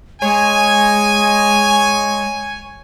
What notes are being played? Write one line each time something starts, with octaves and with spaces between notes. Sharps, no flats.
G#3 C#5 G#5